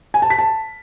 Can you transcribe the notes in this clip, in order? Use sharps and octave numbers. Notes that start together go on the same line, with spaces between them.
G#5
A5
B6
A5